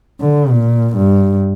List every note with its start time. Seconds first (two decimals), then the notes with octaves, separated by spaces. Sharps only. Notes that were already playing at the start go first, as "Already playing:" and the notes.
0.21 D3
0.51 A#2
0.96 G2